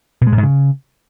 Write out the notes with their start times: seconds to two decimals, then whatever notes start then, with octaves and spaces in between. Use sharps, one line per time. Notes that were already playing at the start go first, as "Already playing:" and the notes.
0.21 B2
0.27 G#3
0.32 A2
0.38 G#2
0.43 C#3